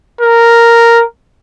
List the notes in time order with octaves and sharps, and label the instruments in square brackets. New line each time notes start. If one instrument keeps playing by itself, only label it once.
[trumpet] A#4